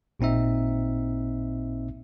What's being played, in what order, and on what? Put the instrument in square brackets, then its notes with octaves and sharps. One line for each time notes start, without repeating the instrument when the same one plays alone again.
[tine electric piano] A1 A#2 C4 D#4 E5